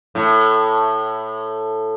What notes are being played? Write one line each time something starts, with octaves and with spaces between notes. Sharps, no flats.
A2